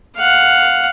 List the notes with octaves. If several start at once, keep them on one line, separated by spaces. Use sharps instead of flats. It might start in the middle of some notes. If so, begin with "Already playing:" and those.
F5 F#5